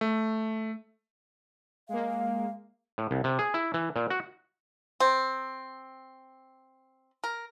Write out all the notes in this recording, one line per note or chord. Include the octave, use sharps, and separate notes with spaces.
A3
G#3 A#3 F5
A2
C2
C3
G#4
E4
E3
A#2
F#4
C4
A#4